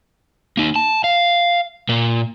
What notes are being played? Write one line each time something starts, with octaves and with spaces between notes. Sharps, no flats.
A#3 D#4
A5
F5
A#2 A#3